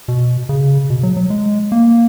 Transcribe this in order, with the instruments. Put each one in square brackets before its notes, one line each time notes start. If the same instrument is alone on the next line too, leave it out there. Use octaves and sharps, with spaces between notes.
[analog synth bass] B2
C#3
B2
F#3
F#3
G#3
A#3